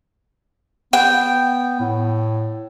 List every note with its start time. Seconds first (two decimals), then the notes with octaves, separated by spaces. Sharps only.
0.93 B3 G5
1.80 A2